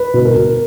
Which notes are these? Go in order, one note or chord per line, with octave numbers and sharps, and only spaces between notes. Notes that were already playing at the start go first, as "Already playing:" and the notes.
Already playing: B4
B2
A#4
B2